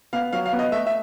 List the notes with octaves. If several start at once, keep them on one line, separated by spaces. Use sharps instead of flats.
B3 F5
F#3 F5
F5
B3
D#5
A3 E5
E5